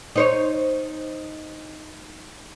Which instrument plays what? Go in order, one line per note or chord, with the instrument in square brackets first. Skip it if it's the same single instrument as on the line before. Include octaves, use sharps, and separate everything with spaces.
[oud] D#4 C5 C#5